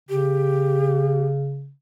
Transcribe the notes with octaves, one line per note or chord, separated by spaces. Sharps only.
C#3 G4